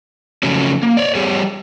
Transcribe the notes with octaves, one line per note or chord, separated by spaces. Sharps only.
C#3 F3 F#3 A3 C#4
A#3
C#5 D5
G3 G4 G#4 C#5